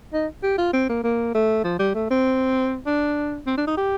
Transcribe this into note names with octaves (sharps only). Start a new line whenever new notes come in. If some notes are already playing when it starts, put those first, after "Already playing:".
D#4
G4
F4
C4
A#3
A#3
A3
F3
G3
A3
C4
D4
C4
D4
D#4
G4